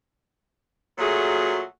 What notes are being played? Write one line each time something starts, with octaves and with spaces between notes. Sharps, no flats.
A#2 F#3 A3 F#4 G#4